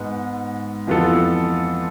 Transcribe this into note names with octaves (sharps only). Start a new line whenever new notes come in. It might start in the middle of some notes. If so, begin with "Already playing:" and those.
Already playing: G#2 G#3 B3
F2 E3 B3 F4 A4